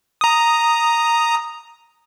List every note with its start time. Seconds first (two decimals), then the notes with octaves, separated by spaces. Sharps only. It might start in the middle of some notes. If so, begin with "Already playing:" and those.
0.21 A#5 D#6